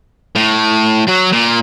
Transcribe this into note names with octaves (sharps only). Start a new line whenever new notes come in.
A2
F#3
A#2